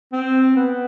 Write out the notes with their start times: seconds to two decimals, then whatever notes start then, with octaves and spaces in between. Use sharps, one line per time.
0.12 C4
0.56 B3